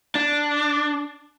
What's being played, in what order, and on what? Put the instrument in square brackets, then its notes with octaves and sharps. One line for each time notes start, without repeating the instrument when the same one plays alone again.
[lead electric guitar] D4